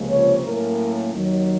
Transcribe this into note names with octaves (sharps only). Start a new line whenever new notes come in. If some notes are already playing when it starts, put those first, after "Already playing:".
Already playing: C#2 C3 F3 A#3 C#4
C#5
A2 F#3 A#3 C#4 A#4
D#2 D#3 F#3